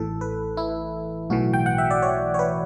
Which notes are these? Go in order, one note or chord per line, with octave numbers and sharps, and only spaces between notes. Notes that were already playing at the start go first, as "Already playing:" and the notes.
Already playing: A1 A2 E3 A4
B4
E4
B1 A2 E3 F#4
G5
F#5
E5
D5
C#5
C#5
B4